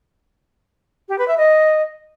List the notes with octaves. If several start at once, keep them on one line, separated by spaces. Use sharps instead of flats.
G4
B4
E5
D#5